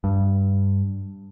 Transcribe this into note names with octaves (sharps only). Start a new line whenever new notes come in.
G2